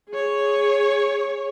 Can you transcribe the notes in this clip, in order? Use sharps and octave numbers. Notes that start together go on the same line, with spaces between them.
G#4 C#5